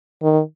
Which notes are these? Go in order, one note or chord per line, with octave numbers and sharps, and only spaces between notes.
D#3